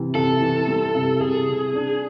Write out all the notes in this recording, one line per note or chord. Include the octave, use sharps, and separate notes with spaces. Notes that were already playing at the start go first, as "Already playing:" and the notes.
Already playing: C3 E3
C3 A4
E3
G3
C3
C3 G#4
C3
D4